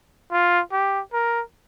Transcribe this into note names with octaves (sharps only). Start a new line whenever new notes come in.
F4
G4
A#4